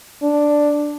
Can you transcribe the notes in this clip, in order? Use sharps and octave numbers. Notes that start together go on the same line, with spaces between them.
D4